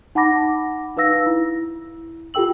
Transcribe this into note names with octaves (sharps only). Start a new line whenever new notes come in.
D#4 F#5 A5 B5 D6 A#6
D#4 B4 F5 E6 A#6
E4
F4 G4 A4 G5 E6 F#7